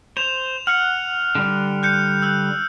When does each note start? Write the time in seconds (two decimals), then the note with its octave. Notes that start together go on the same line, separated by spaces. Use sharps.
0.17 C5 F7
0.67 F#5 F6 F#6 C#7
1.35 D3 G3 D4
1.83 F#6 G6 C#7
2.22 E6 F#6 G6